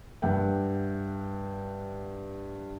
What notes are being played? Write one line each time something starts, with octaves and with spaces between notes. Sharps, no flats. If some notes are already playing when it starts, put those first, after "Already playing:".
G2 E5 F#5 G5